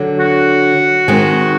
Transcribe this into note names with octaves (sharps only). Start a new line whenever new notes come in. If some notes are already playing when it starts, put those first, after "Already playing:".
Already playing: D3 F#3
F#4
D#3 G#3 C4 D#4